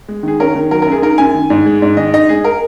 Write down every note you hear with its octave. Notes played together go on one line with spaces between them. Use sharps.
G#3
D#3 G#4
C#4 A#4
D#3
F#3 A#4
F#2 A#4
G#4
D#4 A#4
F#2 G#5
D#3
G#2
G#3
G#2
D#3 D#5
D#4 D#5
G#3 G#4
A#4